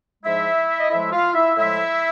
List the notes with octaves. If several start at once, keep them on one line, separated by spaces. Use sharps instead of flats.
G#2 F3 G#3 E4 E5
D#5
A2 F3 G#3 E4 E5
F4 F5
E4 E5
A2 F3 G#3 E4 E5